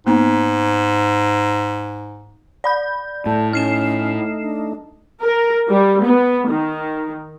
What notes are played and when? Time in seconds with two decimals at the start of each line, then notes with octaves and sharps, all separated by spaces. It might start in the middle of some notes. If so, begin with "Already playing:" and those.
0.07 G#2 A#3 B3 D#4
2.64 D5 B5 G6
3.26 A2 A5
3.53 A3 C#4 D#4 F6 C7 E7
4.42 D4
5.21 A#4
5.69 G3
6.02 B3
6.48 D#3